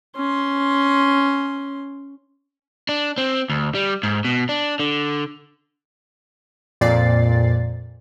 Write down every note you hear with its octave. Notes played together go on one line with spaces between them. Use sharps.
C#4 C6
D4
C4
D2
G3
G#2
B2
D4
D3
F2 A#2 D5 A6 C7